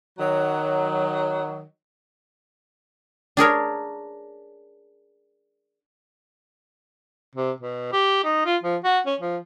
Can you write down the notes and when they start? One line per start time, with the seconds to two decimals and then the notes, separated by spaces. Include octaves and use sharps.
0.19 D#3 F#3
3.37 D4 G#4 A#4 C#5
7.35 C3
7.61 B2
7.93 G4
8.24 D#4
8.45 F4
8.63 F3
8.84 F#4
9.06 C#4
9.20 F3